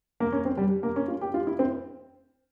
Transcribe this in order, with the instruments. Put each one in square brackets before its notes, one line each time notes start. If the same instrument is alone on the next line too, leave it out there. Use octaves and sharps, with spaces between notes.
[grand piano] A#3
C#4
C4
G3
A#3
C#4
F4
G4
F4
E4
C4